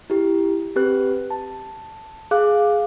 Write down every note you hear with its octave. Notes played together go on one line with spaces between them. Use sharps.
E4 G4
C4 G4 B4 F#6
A5
G#4 F5 D6 F#6